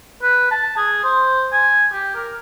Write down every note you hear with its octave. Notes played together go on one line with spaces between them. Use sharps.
B4
A5
G#4
C5
G#5
G4
A#4